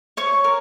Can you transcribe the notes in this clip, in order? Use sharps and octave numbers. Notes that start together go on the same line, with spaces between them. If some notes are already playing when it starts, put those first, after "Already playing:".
C#5 C#6
A#4